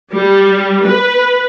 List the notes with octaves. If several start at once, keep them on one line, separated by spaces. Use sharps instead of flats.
G3
B4